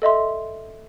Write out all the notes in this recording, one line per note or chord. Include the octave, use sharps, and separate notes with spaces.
A4 D#5 E5 C6